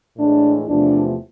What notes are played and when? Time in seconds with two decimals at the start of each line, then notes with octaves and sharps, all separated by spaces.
0.17 A2 E3 G#3 D4
0.66 E2 C3 F3 A3 D4